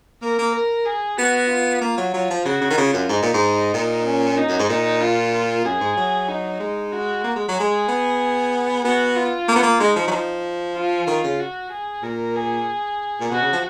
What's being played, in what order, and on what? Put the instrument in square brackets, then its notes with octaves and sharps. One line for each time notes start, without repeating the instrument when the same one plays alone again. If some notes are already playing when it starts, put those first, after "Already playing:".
[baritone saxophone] A#3 [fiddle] A#4
[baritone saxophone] A#3
[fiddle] A#4
G#4
[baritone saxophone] B3 [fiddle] F#4
[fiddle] F4
[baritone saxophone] A#3
F#3
[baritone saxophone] F#3 [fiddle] F4
[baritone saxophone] F3
[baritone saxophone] C#3 [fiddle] F#4
[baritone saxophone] C#3
D#3
[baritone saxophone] C#3 [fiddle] F4
[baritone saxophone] F#2
[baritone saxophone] G#2 [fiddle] D#4
[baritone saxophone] A#2
G#2
A#2
[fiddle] C#4
D#4
[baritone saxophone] F#2
G#2
[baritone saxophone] A#2 [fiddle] D#4
[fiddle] F4
F4
[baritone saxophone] F#2 [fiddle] G#4
[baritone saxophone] G#2
F#3
[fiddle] D#4
[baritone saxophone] G#3
[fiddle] F#4
[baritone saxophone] A#3
G#3
F#3
[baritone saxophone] G#3 [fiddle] G#4
[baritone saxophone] B3
[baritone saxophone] B3 [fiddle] F#4
[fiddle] F4
[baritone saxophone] A#3
B3
A#3
[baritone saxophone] G#3 [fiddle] D#4
[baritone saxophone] F3
F#3
F3
[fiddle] F4
[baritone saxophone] D#3
C#3
[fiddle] F#4
G#4
[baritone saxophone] A#2 [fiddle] A#4
[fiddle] G#4
[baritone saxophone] A#2
[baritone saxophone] B2 [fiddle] F#4
[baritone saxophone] C#3
F3